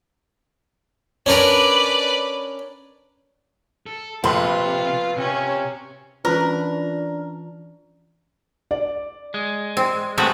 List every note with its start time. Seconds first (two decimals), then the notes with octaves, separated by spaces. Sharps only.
1.26 C#4 D4 A#4 B4 D5
3.86 A4
4.24 A#1 C3 A3 F4 B4 C6
5.17 C3 C#4
6.25 E3 C#4 D4 F4 A#4 B4
8.71 D5
9.34 G#3
9.77 C4
10.18 G#3 A3 B3 C4 F#4 A#5